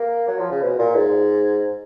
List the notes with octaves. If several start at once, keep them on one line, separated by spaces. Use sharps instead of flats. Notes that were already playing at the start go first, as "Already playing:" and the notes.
Already playing: A#3
F#3
F3
C#3
B2
A#2
G#2